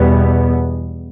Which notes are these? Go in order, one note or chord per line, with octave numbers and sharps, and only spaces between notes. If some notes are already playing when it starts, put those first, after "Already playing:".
Already playing: E2 B2 G3 B3